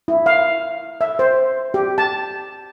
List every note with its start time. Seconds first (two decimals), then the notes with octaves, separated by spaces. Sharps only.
0.08 E4
0.26 F5
1.01 E5
1.19 C5
1.74 G4
1.98 A5